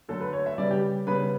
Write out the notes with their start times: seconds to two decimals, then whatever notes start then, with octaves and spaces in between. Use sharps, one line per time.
0.09 D3 F#3 A3 A4
0.21 B4
0.33 C#5
0.46 E5
0.58 C#3 G3 B3 D5
0.71 G4
1.07 C#3 G3 B3 B4